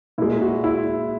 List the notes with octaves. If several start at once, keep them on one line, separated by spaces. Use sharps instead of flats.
A#2 G#3 E4
F#4
E4